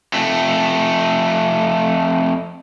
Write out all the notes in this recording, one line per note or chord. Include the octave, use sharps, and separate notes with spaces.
F2 A3